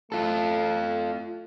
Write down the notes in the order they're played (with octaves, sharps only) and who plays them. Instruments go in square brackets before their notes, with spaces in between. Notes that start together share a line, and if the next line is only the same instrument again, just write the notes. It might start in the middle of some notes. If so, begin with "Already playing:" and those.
[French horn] A3 [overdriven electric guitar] F4 A4